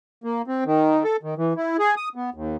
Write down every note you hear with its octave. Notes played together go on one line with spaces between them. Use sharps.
A#3
C4
D#3
A4
D#3
E3
E4
G#4
D#6
B3
D#2